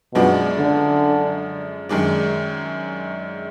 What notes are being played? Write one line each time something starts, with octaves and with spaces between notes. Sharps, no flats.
F#2 B2 F3 G#3 D4
D3
F#2 D#3 G#3 D4